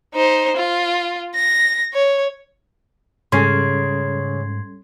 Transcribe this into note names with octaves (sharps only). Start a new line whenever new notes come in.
D#4 C5
F4
A#6
C#5
G#2 C#3 G3 C#4 A4 C6 G#6 C7